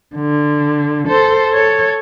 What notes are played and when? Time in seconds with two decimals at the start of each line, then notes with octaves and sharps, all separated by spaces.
0.16 D3
1.08 A4 C5
1.53 A4 C#5